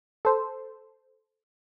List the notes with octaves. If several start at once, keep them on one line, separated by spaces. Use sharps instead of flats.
A4 C5